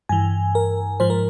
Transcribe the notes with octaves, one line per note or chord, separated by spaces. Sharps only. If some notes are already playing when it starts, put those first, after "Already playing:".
G2 E3 G#5
A#4
G#2 F3 C5
A#4